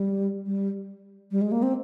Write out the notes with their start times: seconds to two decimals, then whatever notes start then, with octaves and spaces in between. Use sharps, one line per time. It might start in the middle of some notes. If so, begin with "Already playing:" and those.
Already playing: G3
0.46 G3
1.31 G3
1.41 G#3
1.52 A#3
1.63 C4